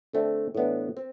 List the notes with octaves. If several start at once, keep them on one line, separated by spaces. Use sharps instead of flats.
D3 A3 C4
A2 E3 B3 D4
C4